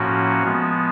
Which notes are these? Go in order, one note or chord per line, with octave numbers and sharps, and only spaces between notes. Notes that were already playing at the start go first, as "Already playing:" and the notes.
Already playing: A2 F3 A#3 C#4 F#4
F3 G#3 B3